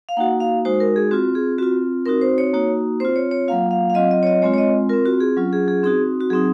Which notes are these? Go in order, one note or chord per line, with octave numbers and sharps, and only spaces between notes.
F5
A#3 D#4 F#4 F#5
F5
G#3 D#4 F#4 C5
A#4
G#4
C4 F4 F#4
G#4
C4 F4 F#4
C4 D#4 F#4 A#4
C5
C#5
A#3 D#4 F#4 C#5
C4 F4 C5
C#5
C#5
F#3 A#3 F4 F5
F5
F5
F#3 C4 F4 D#5
D#5
C#5
D#5
G#3 C4 F4 C#5
C#5
D#5
C4 F4 A#4
F#4
G#4
F#3 C#4 F4
G#4
G#4
C4 D#4 F#4 G#4
F#4
F#3 C4 D#4 G#4